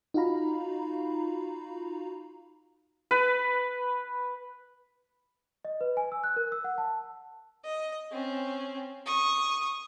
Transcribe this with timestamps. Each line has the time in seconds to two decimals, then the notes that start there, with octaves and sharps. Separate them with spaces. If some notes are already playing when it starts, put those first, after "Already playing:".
0.14 D#4 F4 F#4 F5 A#5 B5
3.11 B4
5.65 D#5
5.81 B4
5.97 G#5
6.12 E6
6.24 F#6
6.36 A#4
6.52 E6
6.64 F#5
6.78 A5
7.64 D#5
8.11 C4 C#4
9.06 C#6 D#6